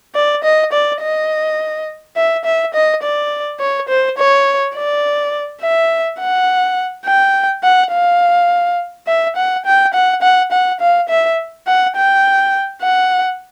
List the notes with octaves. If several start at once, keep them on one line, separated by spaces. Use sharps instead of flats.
D5
D#5
D5
D#5
E5
E5
D#5
D5
C#5
C5
C#5
D5
E5
F#5
G5
F#5
F5
E5
F#5
G5
F#5
F#5
F#5
F5
E5
F#5
G5
F#5